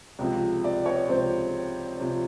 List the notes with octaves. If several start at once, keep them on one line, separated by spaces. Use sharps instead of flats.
C#2 C3 F3
D5
C#5
C#2 C3 F3 C5
C3 F3